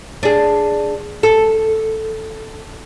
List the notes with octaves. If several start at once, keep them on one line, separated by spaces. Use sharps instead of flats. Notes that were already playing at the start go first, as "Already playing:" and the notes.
D4 G#4
A4